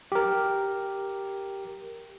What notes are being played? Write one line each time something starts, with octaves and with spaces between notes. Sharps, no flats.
G4 A#4